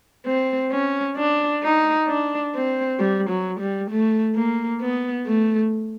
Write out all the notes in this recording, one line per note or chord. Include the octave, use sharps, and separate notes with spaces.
C4
C#4
D4
D#4
D4
C4
G3
F#3
G3
A3
A#3
B3
A3